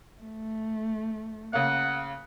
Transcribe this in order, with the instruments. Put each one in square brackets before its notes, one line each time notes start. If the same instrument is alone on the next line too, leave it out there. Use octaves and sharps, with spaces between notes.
[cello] A3
[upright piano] C#3 A#3 [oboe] F#5